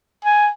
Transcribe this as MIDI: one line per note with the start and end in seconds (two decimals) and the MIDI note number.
0.25 0.49 80